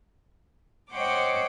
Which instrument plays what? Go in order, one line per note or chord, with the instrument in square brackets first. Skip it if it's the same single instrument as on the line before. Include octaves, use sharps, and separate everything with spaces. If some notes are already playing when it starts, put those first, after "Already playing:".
[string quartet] C5 C#5 D#5 F#5 G5 D6